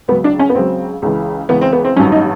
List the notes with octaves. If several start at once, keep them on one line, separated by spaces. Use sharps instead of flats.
C#2 C#3 F#3 B3
D4
C#4
B3
C#2 C#3 F#3 C4
C#2 C#3 E3
C#2 C#3 E3 B3
C4
B3
C4
A1 G2 D#3 F#3 C#4
D#4